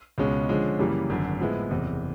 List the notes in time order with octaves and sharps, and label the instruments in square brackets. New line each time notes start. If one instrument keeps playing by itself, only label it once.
[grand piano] C#2 B2 G#3 C#4
D3 F3 G#3 C#4
F#2 C#3 E3 G3 A#3
G#1 F#2 D3
A2 F3 G#3 B3 E4
F#1 E2 C3